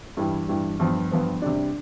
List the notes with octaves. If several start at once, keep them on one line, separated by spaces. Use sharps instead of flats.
G2 E3 G3
G2 E3 G3
G2 F3 B3
G2 F3 B3
C3 G3 D4